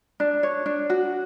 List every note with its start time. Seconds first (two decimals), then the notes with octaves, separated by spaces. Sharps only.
0.20 D4
0.43 C#5
0.66 D4
0.90 F#4